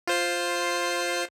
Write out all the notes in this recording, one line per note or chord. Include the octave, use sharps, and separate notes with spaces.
F4 C5 C7